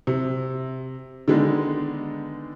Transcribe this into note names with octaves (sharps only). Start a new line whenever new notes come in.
C3
D3 D#3 G#3 B3 D4 D#4